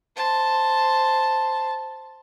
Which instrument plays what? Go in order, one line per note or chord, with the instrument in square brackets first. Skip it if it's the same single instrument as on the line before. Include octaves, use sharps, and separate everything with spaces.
[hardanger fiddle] C5 A5